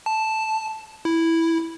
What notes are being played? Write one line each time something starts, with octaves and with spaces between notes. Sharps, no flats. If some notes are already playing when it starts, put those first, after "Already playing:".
A5
E4